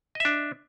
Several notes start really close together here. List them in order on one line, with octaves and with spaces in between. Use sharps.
D#5 E5 D4